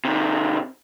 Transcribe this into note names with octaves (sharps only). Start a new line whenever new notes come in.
C3 D#3